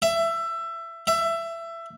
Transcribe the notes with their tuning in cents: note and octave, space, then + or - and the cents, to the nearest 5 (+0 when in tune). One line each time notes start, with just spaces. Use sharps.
E5 +20
E5 +20